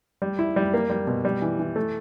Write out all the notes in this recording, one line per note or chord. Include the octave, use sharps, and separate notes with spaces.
G3
E4
G3
A#3
G3
B2
G3
E3
E3
A3